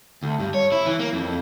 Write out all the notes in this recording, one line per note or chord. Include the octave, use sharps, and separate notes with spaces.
D2
G2
C#5
E4
E3
A#3
F2